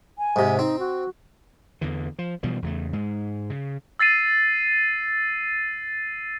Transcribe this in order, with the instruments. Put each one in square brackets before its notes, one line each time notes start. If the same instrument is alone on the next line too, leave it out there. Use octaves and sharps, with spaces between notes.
[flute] G#5
[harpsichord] G#2 C3
[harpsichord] C4 [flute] D#4
[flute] F#4
[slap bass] E2 D3 E3
F3
B2 E3 F3 G3
E2 C#3 A3
G#2 G#3
C#3
[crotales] E6 A6 C7 D#7